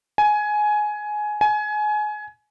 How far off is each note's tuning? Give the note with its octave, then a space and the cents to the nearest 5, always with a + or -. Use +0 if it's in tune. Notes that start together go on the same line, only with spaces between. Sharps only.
G#5 +15
G#5 +25